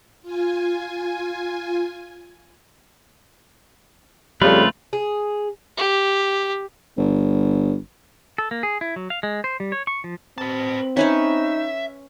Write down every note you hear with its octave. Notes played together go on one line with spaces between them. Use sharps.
F4 G#5
F2 C#3 G3 A3 F4 B4
G#4
G4
G1
A4
A#3
G#4
E4
F#3
F5
G#3
C5
G3
C#5
C#6
F3
C4 B4 A5
C#4 D#4 B4 C#5 E5